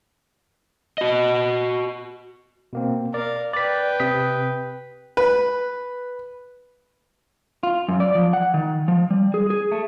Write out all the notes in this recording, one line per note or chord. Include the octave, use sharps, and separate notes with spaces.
F#4 D#5
B2 A#3 C4
A#4 D5 F5
B4 D5 G5 B6
C3 D#6 B6
B4
F4
F#2
D5
F3
F#5
D#3
F3
G3
G#4
G#4
A3